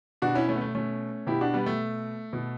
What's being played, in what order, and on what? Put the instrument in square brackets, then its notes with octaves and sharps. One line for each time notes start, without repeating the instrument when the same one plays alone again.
[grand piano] B2 D4 F#4
C#4 E4
A3 C#4
B3
A3
A3 C#4
B2 E4 G4
D4 F#4
G3 B3
A3
B2